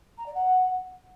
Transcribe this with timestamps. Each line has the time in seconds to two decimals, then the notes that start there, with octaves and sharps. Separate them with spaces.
0.17 A#5
0.26 D5
0.34 F#5